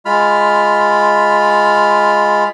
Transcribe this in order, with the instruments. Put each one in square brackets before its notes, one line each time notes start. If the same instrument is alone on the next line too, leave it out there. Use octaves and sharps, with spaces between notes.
[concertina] G#3 F4 B5 F6